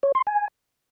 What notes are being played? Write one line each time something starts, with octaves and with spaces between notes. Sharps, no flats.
C#5
C6
G#5